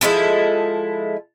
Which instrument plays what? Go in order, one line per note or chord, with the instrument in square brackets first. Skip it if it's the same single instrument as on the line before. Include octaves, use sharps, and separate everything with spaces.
[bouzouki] F3 G#3 E4 A4